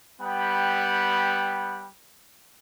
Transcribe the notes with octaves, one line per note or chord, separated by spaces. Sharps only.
G3 B3 F#5 G5 B5